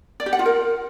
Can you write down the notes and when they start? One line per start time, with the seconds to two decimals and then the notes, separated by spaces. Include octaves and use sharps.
0.20 D5
0.26 G4
0.33 F#5
0.39 F4
0.46 A#4